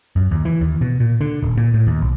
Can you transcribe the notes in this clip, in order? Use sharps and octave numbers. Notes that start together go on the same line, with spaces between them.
F#2
D#2
E3
D#2
B2
A#2
D3
D#1
A#2
A2
D#2
B1